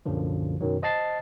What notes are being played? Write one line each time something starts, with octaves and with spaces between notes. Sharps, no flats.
C2 F#2 A#2 D3 F3
F#2 B2 D#3 F#3
C5 D#5 F#5 A5 A6 C7